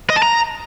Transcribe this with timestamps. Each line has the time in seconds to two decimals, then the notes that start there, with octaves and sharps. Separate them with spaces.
0.10 D#5
0.16 A5
0.22 A#5